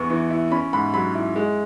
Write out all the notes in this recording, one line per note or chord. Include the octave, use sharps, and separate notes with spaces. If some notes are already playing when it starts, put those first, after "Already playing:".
Already playing: E2 B3 C#6
E3
E4
C#4 B5
G#2 B5
F#3 B5
E4
G#3